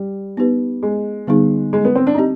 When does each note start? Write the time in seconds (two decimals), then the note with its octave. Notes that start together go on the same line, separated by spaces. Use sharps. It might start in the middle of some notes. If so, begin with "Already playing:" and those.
Already playing: G3
0.37 B3 D#4 G4 B4
0.83 G#3
1.27 D3 G3 B3 D#4 G#4
1.73 G#3
1.85 B3
1.95 C4
2.07 D4
2.15 D#4
2.18 C4 G4